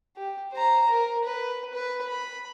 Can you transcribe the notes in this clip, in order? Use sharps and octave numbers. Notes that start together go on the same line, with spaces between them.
G4
C5 A#5
A#4
B4
B4
B5